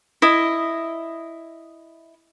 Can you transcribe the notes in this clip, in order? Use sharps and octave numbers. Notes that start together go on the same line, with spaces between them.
E4 D#5